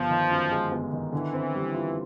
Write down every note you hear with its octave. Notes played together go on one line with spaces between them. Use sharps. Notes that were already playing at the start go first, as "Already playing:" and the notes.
Already playing: G1 F3
D#3
F#2
G#3
G1
D#3
D3 E3
C4
G3
F4